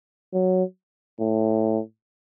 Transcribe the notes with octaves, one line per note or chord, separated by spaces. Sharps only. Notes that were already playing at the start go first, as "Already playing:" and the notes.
F#3
A2